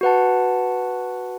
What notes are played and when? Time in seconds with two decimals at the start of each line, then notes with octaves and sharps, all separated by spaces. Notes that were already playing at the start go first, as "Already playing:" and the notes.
0.01 F#4 B4 F#5 A5